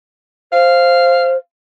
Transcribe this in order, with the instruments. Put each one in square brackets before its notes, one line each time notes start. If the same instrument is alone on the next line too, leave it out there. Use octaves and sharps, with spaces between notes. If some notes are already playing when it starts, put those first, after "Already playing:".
[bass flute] C5 [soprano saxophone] F5